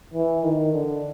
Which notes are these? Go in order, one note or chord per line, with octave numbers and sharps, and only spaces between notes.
E3
D#3
D3